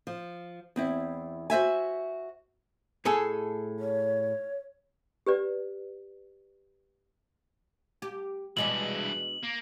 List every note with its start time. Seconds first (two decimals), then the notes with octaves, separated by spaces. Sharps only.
0.07 F3
0.76 E2 C4 E4
1.50 F#4 C5 E5 G#5
3.05 A2 G#4 A4
3.80 C#5
5.26 G4 B4 D5
8.02 G4
8.57 G2 B2 E3 G#3 D4 F#7
9.44 A#3